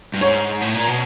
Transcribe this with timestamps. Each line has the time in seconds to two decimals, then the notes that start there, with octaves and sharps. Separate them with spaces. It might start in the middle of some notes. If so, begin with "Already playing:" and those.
0.14 G2
0.21 G#2 C#5
0.61 A2
0.74 A#2
0.87 B2